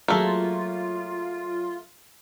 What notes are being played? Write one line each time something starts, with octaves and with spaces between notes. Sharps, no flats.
F#3 A3 A#3 F4 G#4